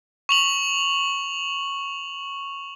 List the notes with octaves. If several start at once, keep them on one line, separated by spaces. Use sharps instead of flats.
C#6 F7 F#7